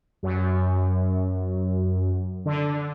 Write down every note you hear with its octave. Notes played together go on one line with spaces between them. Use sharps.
F#2
D3